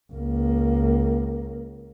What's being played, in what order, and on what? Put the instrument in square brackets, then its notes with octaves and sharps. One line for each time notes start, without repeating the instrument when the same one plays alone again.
[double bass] C#2 A#3